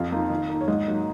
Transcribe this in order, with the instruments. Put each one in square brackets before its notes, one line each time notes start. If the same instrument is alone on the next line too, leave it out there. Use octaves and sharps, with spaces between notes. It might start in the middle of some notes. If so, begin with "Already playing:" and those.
Already playing: [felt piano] F2 F5
F3 A#3 D#4
D#3
A#3 D#4
C#5
G#2 D#5
F#3 A#3 D#4